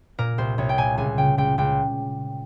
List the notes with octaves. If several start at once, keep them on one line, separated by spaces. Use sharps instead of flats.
A#2 A#4
C2 C5
C2 C#5
G5
A#2 G#5
C#2 G#5
C#3 G5
C#2 G5
C#2 G5